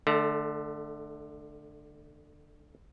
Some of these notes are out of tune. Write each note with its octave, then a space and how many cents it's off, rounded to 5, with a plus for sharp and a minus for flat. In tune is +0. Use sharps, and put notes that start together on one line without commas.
D3 +20 A3 -15